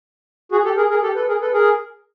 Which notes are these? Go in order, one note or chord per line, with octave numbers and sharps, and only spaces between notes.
F#4 G#4
G4 A4
G#4 A#4
G#4 A#4
G4 A4
A4 B4
G#4 A#4
A4 B4
G#4 A#4